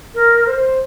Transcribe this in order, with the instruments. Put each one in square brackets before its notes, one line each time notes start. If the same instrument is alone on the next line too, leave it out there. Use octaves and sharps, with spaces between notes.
[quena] A#4
C5